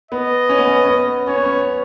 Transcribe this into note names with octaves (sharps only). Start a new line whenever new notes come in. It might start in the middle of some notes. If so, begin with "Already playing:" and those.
B3 D#5
C#4
B3
C#4
C#4
B3
C#4 C#5
B3
C#4